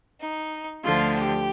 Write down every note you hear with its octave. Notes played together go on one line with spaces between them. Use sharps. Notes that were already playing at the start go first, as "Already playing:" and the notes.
D#4
D2 D3 F3 F4
G4